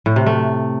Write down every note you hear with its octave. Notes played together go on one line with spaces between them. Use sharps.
A2
C3
A3